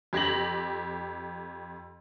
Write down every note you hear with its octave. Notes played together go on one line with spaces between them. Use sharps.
F2 G4 G#6 A#6 F#7